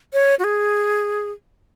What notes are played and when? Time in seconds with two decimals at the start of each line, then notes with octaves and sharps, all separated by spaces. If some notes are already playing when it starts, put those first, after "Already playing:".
0.13 C#5
0.39 F#4
0.44 G#4